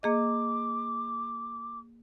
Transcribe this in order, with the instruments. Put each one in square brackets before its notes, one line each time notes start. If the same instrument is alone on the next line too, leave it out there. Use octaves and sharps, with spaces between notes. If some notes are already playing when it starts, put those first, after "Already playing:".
[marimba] A#3 G#4 D#5 [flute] D6